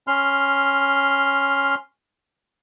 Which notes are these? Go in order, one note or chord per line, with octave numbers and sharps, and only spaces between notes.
C#4 C6 F6